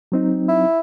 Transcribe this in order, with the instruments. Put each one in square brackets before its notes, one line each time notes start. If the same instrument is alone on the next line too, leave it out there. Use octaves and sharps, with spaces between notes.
[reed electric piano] F#3 C4 D#4
[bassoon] E4